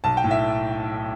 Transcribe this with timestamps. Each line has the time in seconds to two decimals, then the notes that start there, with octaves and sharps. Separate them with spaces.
0.04 B1 A5
0.17 G5
0.24 A2
0.31 E5